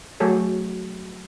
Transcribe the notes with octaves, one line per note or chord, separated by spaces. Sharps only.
F#3 A3 G#4 A4 C#5